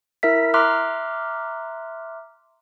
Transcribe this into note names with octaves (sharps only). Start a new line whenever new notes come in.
E4 A#4 E5 B6
E5 A#5 C6 D6 F6 F#6